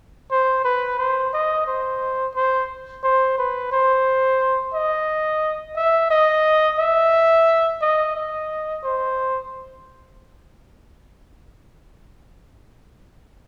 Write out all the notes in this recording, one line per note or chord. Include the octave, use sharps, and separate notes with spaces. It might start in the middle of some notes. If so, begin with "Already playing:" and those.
C5
B4
C5
D#5
C5
C5
C5
B4
C5
D#5
E5
D#5
E5
D#5
D#5
C5